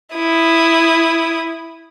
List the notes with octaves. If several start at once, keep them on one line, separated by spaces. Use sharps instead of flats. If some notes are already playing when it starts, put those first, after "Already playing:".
E4 D#6